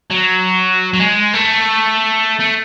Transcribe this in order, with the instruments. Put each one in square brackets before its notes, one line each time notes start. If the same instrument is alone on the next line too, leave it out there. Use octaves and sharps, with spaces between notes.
[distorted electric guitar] F#3
F#3
G#3
A3
A3